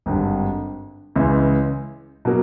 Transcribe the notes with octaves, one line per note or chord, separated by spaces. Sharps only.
G#1 G2 D3
C#2 C#3 E3 G#3
B2 F#3 A#3